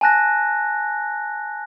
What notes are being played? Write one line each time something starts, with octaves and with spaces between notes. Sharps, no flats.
G#5 A5 F#6 A#6